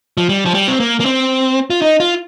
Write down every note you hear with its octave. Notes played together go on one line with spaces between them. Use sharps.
F3
G3
F3
G3
C4
A#3
A#3
C4
F4
D#4
F4